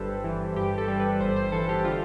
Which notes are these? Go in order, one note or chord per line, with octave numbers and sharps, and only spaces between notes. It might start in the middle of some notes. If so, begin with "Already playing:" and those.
Already playing: G1 G2 G3 G4 A4 B4 C5
E3
G2 G4
A4
G3
B4
G1 C5
C5
E3 A4
G4
D3 F4